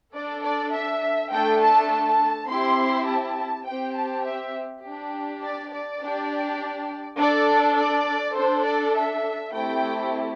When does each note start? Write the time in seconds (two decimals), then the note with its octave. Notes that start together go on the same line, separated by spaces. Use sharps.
0.14 D4 A4 D5
0.43 D5
0.73 E5
1.31 A3 D4 A4 G5
1.61 A5
1.91 A5
2.49 C4 E4 G4 C6
3.07 A5
3.66 C4 G4 G5
3.95 A5
4.25 E5
4.84 D4 G4
5.42 D5
5.72 D5
6.00 D4 G4
7.18 D4 A4 D5
7.76 D5
8.35 D4 A4 C5
8.65 D5
8.95 E5
9.52 A3 C4 E4 G4 G5